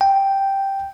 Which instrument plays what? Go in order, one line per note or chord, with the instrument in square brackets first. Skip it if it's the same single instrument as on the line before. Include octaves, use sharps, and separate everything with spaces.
[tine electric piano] G5